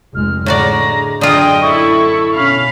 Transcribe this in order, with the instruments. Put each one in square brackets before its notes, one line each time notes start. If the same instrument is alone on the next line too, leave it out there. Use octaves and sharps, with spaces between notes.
[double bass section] F1 G#3 [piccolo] F6
[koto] A2 F#4 D5 [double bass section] D3 [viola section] G#3 [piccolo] A#5
[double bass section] F#2 [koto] D3 F4 [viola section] G#4 D#5 G5 [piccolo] D#6
[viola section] E4 A4 [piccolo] C#6
[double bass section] B2 C#4 [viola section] F5 [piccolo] B5